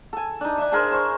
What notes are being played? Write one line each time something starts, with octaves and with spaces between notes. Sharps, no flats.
A4 G#5
D4 D#4
D4 E5
D4 G#4 A#4 C5
C5 C#6